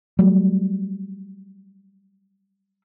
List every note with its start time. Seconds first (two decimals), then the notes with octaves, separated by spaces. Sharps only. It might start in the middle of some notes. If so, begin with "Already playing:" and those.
0.19 F#3 G3 A3